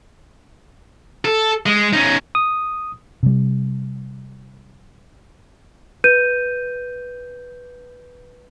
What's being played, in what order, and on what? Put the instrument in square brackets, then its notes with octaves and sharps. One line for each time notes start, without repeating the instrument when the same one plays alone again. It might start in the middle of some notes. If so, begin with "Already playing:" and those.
[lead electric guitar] A4
G#3
C#4 D#4
[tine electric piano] D#6
[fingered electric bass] C3 G3
[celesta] B4 G6 D#7